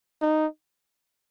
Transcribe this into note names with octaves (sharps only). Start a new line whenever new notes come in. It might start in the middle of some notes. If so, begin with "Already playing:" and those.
D#4